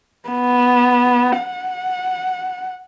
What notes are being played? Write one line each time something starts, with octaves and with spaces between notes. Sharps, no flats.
B3
F#5